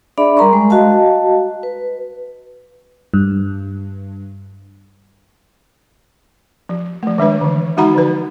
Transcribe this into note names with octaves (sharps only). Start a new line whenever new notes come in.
D4 G#4 D5 E5 B5
G3 A#4 A#5 C6 C#6
G#3
F#4 D#5 F5 A5
B4
G2
F3
F3 A3
D#3 G#3 D4 B4
D3 E3
G#3 D#4 F#4 F#5 A#5 B5
D3 F3 B4